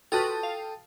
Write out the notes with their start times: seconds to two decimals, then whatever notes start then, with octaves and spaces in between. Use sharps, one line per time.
0.12 F4 F#4 A4 B4 G5 A5 D#6 A6
0.43 F5